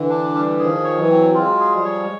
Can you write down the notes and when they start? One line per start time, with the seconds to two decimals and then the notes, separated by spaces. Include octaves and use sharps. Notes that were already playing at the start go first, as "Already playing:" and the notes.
Already playing: D3 E3
0.09 D4
0.35 G3
0.59 D#3 F3 G#4
0.84 C#5
0.97 E3 F#3
1.10 C4
1.34 F#3 G#3 F4
1.60 G#4
1.72 F3 G3
1.85 C#5
2.03 G#3